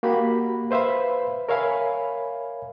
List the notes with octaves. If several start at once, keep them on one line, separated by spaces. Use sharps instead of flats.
A#3 F#4 G4 B5
B4 C5 E5 F5 B5
A#4 C#5 E5 F5 G#5 B5